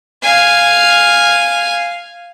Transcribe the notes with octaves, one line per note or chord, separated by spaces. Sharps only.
F5 G#5